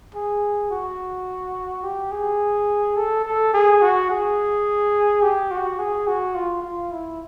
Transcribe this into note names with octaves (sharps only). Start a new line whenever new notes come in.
G#4
F#4
G4
G#4
A4
A4
G#4
F#4
G#4
G4
F#4
G#4
F#4
F4
F4
E4